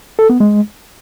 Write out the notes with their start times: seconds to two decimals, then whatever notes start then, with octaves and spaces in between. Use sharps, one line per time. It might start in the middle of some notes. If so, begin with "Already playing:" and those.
0.19 A4
0.30 B3
0.40 G#3